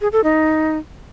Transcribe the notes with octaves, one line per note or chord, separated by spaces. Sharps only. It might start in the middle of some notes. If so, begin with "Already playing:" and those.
G#4
A4
D#4